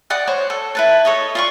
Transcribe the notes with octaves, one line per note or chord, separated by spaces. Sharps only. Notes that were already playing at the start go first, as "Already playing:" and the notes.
D5 F#5 D#6
F#4 C5 C#5
A4
E4 B4 A5
A4 C#5 D#5
F4 D5 C#6